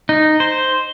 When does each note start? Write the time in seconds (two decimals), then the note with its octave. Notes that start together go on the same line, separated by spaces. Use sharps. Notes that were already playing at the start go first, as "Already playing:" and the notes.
0.09 D#4
0.40 C5